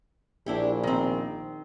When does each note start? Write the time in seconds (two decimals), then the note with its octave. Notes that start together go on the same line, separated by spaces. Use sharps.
0.46 A#1 D4 E4 G4
0.83 D#3 C4